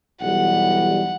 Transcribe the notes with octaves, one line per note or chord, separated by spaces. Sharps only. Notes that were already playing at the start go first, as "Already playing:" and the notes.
B1 E3 G3 F#5